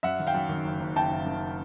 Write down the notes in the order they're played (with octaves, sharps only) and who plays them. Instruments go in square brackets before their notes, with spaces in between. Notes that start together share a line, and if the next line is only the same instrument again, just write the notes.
[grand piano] F#2 E5 F#5
D#3
F5 G5
F#2
D#3
F#1
F#1
F#1 G5 A5
F#1
D#3